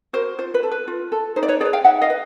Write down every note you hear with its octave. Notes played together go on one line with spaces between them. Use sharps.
F#4 A#4 C5
F4 C5
B4
A4
B4
F4
A4
D#4 C5
D5
B4 C#5
G#4 B4 C5 D5
F5 G5
D#4 E5 F#5
D#5 F5
B4